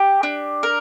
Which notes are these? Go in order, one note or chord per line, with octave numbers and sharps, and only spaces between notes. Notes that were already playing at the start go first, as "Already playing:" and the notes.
Already playing: G4
D4
A#4